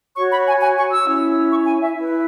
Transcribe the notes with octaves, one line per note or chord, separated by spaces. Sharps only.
F#4 C#5 C#6
B5
G#5
G#5
C#6
E6
C#4 E4 C#5
C#6
G#5
E5
E4
B4